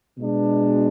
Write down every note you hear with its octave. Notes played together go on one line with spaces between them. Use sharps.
B2 G#3 D4